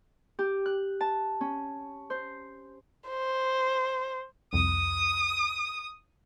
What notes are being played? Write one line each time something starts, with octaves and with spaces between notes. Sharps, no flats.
G4
F#6
A5
C#4
C5
C5
C2 F2 D#6